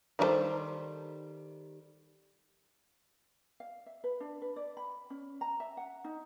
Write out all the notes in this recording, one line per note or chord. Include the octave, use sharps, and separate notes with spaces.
D#3 G3 D4 A4 C5
F5
E5
B4
D4
B4
D5
B5
C#4
A#5
E5
F#5
D#4